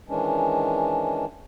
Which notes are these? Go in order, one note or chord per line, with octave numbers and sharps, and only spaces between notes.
D#3 E3 G#3 C#4 D4